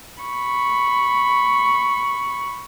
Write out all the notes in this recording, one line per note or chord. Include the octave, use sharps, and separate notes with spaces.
B5 C#6